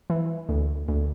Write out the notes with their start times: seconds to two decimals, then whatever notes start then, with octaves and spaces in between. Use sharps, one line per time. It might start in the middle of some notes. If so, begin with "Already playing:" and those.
0.10 E3
0.49 D2
0.88 D2